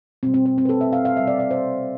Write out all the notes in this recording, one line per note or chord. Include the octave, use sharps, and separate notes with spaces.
B2 G3 C4
C4
C4
C4
B4
A4
E5
F5
F5
C3 G3 E5
D5
D5
C5